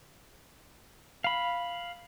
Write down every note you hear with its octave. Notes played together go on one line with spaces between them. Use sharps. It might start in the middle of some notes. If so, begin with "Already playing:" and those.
F5 B5